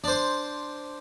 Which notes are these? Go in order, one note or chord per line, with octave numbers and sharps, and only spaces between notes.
D4 C5